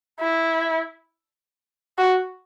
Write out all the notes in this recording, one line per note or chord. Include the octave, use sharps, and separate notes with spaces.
E4
F#4